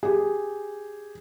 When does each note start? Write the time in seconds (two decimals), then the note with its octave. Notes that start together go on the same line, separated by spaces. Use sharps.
0.03 G4 G#4